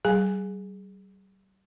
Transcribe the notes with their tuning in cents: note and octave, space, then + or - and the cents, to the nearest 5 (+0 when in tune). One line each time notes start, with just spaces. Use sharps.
G3 -35 G#4 +0 G#5 +0